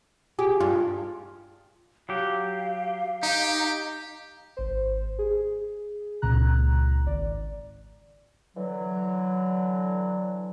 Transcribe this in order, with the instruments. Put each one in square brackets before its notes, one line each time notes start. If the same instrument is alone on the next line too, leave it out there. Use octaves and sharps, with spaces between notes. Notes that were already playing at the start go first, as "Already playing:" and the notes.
[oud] G4 [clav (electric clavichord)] G#4
[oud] G2 [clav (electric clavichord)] F4
[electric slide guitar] F#3 G4 [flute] F5
[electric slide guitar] D#4 [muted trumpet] G4
[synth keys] G#1 C5
G#4
C#2 A#2 C#3 A#5 F#6
G#1 D5
[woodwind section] D3 E3 F#3